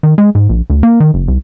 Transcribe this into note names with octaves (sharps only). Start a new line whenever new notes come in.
D#3
G#3
G#2
A#1
D2
A#3
D#3
F#1
C2